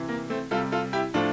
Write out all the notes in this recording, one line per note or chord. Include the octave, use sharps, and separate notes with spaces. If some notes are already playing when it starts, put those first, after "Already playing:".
Already playing: C3 E3
A#3
A3 C4
C3 G3 F4 A4
F4 A4
E4 G4
A2 F3 A3 D4 F4